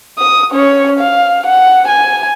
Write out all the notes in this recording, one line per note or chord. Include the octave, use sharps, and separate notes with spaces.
D#6
C#4 C#5
F5
F#5
G#5